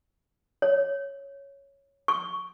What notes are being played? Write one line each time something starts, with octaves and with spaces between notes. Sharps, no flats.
C#5
C#6